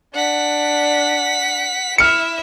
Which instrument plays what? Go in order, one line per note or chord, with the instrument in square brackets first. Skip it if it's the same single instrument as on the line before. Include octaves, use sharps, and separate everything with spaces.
[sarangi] D4 [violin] F#5 B6
[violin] E4 E5 [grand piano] F6 C#7